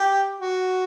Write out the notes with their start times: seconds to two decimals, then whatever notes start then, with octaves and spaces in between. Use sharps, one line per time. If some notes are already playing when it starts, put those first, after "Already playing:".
Already playing: G4
0.40 F#4